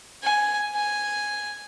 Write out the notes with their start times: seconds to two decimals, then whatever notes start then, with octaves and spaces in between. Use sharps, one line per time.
0.23 G#5
0.75 G#5